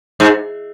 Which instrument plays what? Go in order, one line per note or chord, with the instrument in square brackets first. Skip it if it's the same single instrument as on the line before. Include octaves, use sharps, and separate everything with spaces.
[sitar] G#2